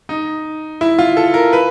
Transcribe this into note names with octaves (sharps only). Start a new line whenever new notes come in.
D#4
E4
F4
A4
A#4
B4